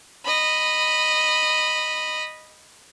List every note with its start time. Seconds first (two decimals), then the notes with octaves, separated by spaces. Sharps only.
0.25 D#5 B5